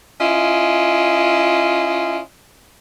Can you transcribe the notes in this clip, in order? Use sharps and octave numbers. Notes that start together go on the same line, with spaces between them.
C#4 E4 F4 D#5